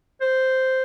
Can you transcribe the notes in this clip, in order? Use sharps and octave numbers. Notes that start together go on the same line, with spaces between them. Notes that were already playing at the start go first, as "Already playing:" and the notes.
C5